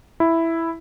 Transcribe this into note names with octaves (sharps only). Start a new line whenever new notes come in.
E4